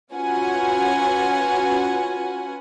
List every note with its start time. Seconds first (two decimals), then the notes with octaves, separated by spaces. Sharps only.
0.12 C#4 F4 F#4 B4 F#5 G#5